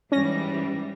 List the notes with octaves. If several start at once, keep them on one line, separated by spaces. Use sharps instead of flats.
G#2 E3 G3 C#4 A#6